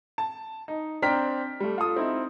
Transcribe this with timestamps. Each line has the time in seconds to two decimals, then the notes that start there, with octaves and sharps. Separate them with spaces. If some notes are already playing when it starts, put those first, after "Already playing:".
0.18 A5
0.68 D#4
1.02 C4 D4 G5 A#5 F6 B6
1.60 G3 A3
1.78 F4 A4 D#6
1.96 C4 D#4 E4